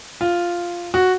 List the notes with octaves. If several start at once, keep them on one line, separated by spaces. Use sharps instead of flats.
F4
F#4